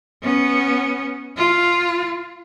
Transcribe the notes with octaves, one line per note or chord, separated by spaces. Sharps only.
B3 C#4
F4